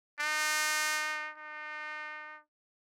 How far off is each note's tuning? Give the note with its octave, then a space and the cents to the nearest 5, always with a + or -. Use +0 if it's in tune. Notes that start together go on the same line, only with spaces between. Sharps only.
D#4 -30
D#4 -40